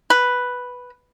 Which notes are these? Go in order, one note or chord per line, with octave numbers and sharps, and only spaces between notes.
B4